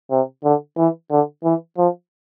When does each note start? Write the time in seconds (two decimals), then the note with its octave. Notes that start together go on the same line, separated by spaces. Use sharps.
0.11 C3
0.44 D3
0.77 E3
1.11 D3
1.44 E3
1.78 F3